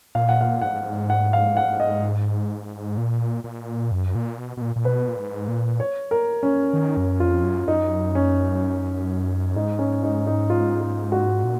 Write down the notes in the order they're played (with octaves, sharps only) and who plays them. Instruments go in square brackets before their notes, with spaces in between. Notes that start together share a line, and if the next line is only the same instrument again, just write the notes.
[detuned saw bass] A#2 [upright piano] F5
[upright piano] F#5
F5
[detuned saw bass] G#2 [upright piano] F#5
[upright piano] F#5
F5
F#5
D#5
[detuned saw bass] A#2
A#2
F#2
A#2
B2
B2
A#2
A#2
[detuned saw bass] B2 [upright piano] B4
[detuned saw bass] A#2
G#2
A#2
[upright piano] C#5
A#4
C#4
[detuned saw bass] D#3
F#2
[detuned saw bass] F2 [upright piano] F4
[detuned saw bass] F#2
[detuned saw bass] F#2 [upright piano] D#4
[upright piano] C#4
[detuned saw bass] G#2 [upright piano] D#4
[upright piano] C#4
D#4
D#4
F4
F4
F#4
[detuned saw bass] A#2